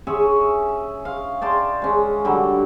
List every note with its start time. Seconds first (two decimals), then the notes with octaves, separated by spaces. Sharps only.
0.07 C#4 G#4 E5 C#6
1.05 F5
1.42 D5 G5 A5 C6
1.82 G#3 C#4
2.25 D3 F#3 G3